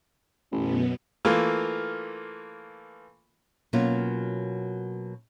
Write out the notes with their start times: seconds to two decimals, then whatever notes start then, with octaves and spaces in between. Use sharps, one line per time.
0.52 A1 F#2 B2 B3
1.25 E3 A3 A#3 F4
3.73 B2 F#3 A#3 C#4 F4